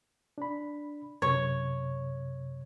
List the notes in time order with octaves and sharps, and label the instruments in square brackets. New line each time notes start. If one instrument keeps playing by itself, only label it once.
[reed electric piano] D4 B5
[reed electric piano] F#2 C3 [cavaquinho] C#5